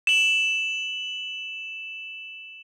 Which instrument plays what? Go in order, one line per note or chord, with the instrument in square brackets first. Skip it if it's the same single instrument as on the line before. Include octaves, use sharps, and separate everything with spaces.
[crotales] E7 F#7